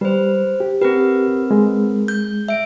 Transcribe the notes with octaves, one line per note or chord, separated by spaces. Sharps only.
G3 B4 C5
G4
C4 G4 A#4 B4
G#3
G6
E5 D7